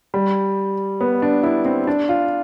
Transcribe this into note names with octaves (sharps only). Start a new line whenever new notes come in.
G3
B3
D4
E4
C4
D4
F4